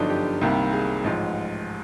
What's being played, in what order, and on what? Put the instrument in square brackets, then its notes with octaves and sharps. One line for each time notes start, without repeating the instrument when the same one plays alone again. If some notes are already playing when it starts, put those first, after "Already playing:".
Already playing: [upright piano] G1 F#2 D3 F3 D4 D#4
G4
C2 C3 D#3 G3 A#3
G#4
A1 G#2 F3